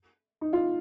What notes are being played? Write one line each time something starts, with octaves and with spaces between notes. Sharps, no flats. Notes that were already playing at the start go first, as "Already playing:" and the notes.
D#4
F4